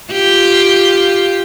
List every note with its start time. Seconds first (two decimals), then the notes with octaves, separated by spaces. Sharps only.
0.12 F4 G4